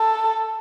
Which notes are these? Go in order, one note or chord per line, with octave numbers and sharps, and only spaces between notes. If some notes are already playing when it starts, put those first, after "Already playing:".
Already playing: A4